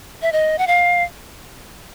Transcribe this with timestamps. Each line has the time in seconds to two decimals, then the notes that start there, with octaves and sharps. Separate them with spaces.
0.22 E5
0.32 D#5
0.58 F#5
0.67 F5